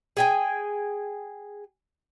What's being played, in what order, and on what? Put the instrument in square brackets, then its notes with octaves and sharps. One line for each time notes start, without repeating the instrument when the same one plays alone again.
[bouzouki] G#4 G5 G#5